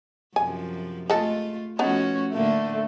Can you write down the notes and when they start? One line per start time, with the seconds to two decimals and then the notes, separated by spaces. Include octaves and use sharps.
0.36 F#2 C3 F3 G#5
1.10 G#3 A3 F4 A4
1.79 F3 A3 B3 C#4 D#4 F#4
2.33 A2 D3 A3 A#3